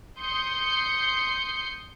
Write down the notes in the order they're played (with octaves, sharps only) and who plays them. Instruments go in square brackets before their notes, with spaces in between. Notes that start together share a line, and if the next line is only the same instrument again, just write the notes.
[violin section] C6 D#6 G6 C7 C#7